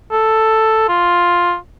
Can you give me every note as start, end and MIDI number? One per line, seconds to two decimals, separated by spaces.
0.11 0.87 69
0.89 1.55 65